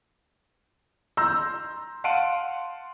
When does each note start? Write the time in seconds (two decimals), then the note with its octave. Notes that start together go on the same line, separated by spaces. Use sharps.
1.17 A#5 C6 E6 G6 A#6
2.04 F5 F#5 A5 C6 D7 D#7